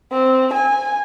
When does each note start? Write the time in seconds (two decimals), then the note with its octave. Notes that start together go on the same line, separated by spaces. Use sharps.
0.12 C4
0.53 G#5